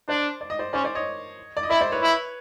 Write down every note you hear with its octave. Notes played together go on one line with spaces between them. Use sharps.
D4 C5 D5
D5
D#5
C5 D5
C#4 C5 D5
C5 D5
C#5 D#5
D5
D#5
E4 D5 E5
C5 D5
B4 C#5
E4